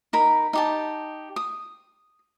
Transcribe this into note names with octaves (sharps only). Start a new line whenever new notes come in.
D#4 A#4 B5
D#4 G4 A5
D#6